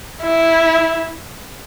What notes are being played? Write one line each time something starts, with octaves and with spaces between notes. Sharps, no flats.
E4